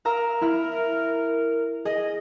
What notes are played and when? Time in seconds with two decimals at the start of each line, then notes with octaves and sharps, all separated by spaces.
0.05 A#4 F5 A#5 E6
0.42 E4 B5 F6
1.85 G#4 D#5